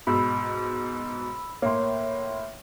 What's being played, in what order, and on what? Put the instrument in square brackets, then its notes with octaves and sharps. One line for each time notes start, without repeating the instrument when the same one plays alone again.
[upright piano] G#2 B2 [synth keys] B5 E6
[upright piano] A2 A#3 [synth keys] C#5 C6